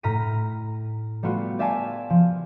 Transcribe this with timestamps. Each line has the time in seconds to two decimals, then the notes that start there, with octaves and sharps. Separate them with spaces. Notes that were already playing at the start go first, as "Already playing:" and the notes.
0.03 A2 A#5 F6 B6 D#7
1.23 G3 A3 B3 F4 F#4
1.59 G4 D5 E5 F5 G#5 A5
2.10 F3